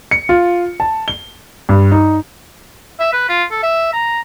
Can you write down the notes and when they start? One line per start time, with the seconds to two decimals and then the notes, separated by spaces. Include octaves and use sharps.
0.11 C#7
0.29 F4
0.80 A5
1.08 G7
1.69 G2
1.92 D#4
3.00 E5
3.13 B4
3.29 F4
3.51 A4
3.63 E5
3.93 A#5